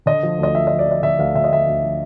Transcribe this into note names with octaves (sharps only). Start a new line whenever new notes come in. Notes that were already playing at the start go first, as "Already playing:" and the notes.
D3 D#5
F3
D2 D#5
F3 E5
D#5
F3
D5
F3 D#5
D3 E5
D2 F5
D3 E5
D#5
D2 E5
D2
F3